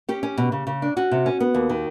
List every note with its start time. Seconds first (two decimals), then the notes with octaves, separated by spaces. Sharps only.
0.09 C#4 G4
0.23 C#4
0.38 B2
0.52 C#3
0.67 C#3
0.82 D4
0.96 C#4 F#4
1.11 C3
1.26 C#4
1.40 B3
1.54 D#2
1.69 D#3